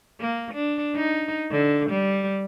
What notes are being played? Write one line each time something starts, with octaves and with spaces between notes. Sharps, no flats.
A#3
D4
D#4
D3
G3